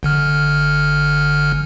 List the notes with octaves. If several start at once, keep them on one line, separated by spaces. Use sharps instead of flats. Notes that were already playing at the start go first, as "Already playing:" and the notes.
G1 D3 F6